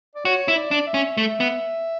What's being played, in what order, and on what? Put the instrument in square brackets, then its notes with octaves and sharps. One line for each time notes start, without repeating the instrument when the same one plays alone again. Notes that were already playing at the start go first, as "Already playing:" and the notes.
[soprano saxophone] D5
[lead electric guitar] F#4 [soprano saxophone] C#5
[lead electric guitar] E4
[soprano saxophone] D5
[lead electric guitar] D4
[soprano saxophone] E5
[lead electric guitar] C#4
A3
B3